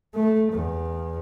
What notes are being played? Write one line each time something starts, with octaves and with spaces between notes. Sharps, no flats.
A3
E2